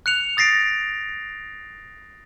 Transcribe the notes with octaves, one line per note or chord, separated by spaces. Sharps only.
F#6 C#7 F7
D#6 A6 A#6 C7 D7